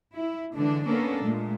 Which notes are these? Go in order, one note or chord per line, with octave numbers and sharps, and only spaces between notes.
E4
D3 E3 G#3 D4
A#3 B3 C#4 D4 A4 A#4
A#2 G#3 A3